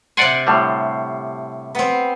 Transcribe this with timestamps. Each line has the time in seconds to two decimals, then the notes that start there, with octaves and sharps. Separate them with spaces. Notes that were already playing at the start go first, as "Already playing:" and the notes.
0.17 C3 C5 D5 F#5 G#5 C6
0.47 A2 D3 G3
1.75 B3 C4